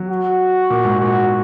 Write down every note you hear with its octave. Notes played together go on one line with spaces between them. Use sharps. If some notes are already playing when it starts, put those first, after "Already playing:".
Already playing: F#3
F#4
A#2
G#2
A#2 F#4